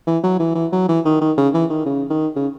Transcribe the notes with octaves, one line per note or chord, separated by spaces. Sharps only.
E3
F#3
E3
E3
F#3
E3
D#3
D#3
C#3
E3
D#3
C#3
D#3
C#3